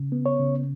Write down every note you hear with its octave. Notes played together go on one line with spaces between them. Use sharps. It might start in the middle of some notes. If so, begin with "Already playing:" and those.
Already playing: C#3
B3
C#5
C#3